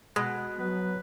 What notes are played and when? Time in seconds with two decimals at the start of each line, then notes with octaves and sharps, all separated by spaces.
0.16 B2 G#3 F#5
0.59 F#3 B3 B4